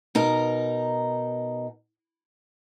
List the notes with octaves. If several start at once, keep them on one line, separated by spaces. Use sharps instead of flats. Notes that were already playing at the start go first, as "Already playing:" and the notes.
B2 D#4 A#4